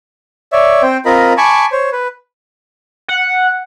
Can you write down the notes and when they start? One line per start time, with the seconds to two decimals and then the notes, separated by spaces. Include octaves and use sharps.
0.52 C#5 D5 E5
0.82 C4 C5 G5
1.05 C4 F4 A#4 D#5 B5
1.37 G#5 A5 B5 C#6 D6
1.72 C5 C#5
1.92 B4
3.08 F#5